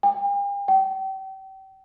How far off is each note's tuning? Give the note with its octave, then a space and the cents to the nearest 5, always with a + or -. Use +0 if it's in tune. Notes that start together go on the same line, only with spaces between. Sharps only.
G5 +45
G5 -35